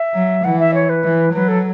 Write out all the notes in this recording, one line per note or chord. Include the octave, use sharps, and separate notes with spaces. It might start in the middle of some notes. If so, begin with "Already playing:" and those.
Already playing: E5
F#3
E3 F#5
E5
C#5
B4
E3
F#3 B4
A4